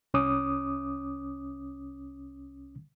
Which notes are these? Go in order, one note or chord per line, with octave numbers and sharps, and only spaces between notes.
C2 C#4 D6 D#6